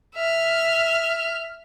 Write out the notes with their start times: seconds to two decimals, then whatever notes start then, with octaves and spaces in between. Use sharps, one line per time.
0.16 E5 F6